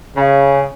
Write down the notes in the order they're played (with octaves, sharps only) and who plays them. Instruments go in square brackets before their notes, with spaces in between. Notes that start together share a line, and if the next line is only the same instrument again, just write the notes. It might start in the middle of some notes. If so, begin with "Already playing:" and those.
[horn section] C#3